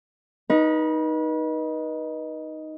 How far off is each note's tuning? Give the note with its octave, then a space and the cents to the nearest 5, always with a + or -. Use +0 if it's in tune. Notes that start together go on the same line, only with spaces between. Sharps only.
D#4 +0 B4 -35